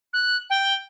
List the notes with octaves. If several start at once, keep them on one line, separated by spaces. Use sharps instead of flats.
F#6
G5